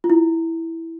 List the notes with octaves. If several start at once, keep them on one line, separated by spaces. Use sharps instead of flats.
F4
E4